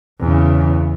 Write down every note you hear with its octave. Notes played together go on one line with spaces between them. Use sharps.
E2 C#3